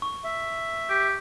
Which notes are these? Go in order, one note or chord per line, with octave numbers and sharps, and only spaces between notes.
C#6
E5
G4